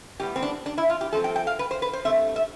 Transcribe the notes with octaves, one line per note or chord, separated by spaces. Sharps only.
A2 G3 B3 G4
C4
D4
D4
E4
F4
G4
G2 F3 A3 C4 A4
G5
G5
F5
B4
C5
B4
C5
G2 E3 A3 C4 E5
E5